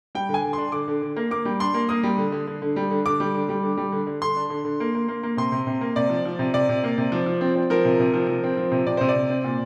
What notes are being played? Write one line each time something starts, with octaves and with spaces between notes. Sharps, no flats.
G3 G5
D3
G#5
D3
D4 C6
D3 D6
D3
D3
A#3
A#3 D6
G3
D4 C6
A#3
A#3 D#6
G3
D3
D3
D3
D3
G3
D3
D3 D6
G3
D3
G3
D3
G3
D3
D3
D3 C6
D4
D3
D3
A#3
A#3
A#3
A#3
C3 C6
C3
C3
A#3
C3 D5
F3
F3
C3
C3 D5
C3
A#3
C3
F3
F3
C4
C4
F3 A#4
C3
C3
F3
F3
C4
F3
C3
C3 D5
C3 C5
D5
C3
C4
A#2